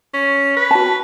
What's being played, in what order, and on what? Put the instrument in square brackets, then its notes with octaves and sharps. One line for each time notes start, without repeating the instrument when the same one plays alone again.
[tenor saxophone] C#4
B4
[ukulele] F#4 A5